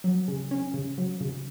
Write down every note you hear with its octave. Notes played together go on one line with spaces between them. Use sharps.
F#3
C#3
C#4
C#3
F#3
C#3